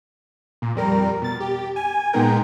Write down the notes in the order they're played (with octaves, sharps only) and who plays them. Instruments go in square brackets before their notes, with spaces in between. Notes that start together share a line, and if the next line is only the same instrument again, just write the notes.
[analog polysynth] A#2
F2 G3 A#4
B2 A6
G4
G#5
A#2 G#3 B3 D#4 A#4 G5